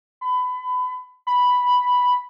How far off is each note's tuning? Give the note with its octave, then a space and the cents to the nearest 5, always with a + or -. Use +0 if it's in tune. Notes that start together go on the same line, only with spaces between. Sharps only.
B5 +25
B5 +0